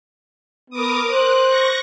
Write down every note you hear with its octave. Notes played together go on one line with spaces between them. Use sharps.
B3 A#4 D6 D#6
C5 F#6
C#6 A#6